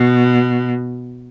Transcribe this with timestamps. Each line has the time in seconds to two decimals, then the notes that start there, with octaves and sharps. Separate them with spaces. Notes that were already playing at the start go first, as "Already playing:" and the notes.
Already playing: B2